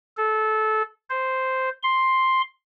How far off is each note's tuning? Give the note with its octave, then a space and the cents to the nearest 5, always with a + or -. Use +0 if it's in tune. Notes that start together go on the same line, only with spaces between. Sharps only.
A4 -20
C5 -5
C6 +5